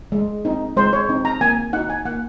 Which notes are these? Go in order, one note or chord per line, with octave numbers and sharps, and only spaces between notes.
G#3
C4 D#4
G#3 C5
C#5
C4 D#4
A#5
A#3 G#5
D#4 F#4 F#5
G#5
A#3 F#5